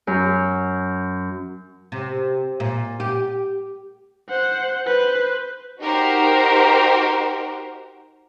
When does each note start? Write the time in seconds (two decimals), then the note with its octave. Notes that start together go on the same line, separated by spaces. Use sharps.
0.07 F#2
1.92 C3
2.60 A#2
3.00 G4
4.29 C5 F#5
4.87 B4 C5
5.79 D#4 F#4 G4 A#4 C5